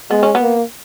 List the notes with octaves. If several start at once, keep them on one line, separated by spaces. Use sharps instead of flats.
G#3 B3
C#4
B3
A#3